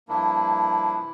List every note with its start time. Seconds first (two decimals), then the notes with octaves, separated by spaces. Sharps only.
0.08 G2 F3 A#3 D4 E4
0.96 C3 E3